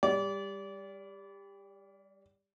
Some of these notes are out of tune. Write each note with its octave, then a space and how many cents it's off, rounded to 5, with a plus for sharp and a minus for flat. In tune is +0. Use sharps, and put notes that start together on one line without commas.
G3 +20 D5 -30